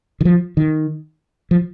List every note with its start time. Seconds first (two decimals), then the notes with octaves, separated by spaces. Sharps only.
0.21 D#3
0.25 F3
0.57 D#3
1.51 F3